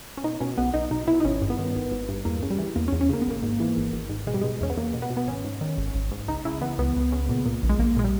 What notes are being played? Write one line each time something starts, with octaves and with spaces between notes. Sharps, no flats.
C#4
B2 D#4
B2 C#4
B1 B3
B1 D#4
B2 D#4
B2 E4
D#4
G#1 C#4
G2
B3
D#3
G#1
G#1
G2
E2 A#3
C#3
G3
E3
E2 A#3
C#4
E2
C#4
C#3 A#3
B3
G#1 A#3
G#2
E3
G#1
G#1
G#2
B2 G#3
G3
B2 G#3
E2 C#4
B3
E2 A#3
B2
B3
B2
B3
G#1 C#4
G#2
D#3
G#1
G#1
G#2
C#2 D#4
C#3 E4
E3 B3
C#2 B3
C#2
C#3
A#2
A#2
A#1
G#3
A#1 A#3
A#2 G#3
G3